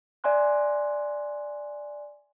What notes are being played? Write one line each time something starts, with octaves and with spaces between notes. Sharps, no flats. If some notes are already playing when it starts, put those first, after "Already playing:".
D5 E5 G#5 C6 F#6